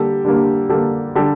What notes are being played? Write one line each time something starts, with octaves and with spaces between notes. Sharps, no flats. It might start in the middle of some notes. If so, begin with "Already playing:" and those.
Already playing: D3 G3 A#3 G4 A4
D3 G3 A#3
D3 G3 A#3 G4 A4
D3 G3 G4 A4